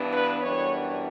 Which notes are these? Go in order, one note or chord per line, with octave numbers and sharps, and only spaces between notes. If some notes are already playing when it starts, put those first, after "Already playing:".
Already playing: G2 E3 B3 D4
B4
F#2 E3 G3 B3 D4 C#5